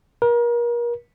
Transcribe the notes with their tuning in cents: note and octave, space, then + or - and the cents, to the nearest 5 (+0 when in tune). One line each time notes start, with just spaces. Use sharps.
A#4 +35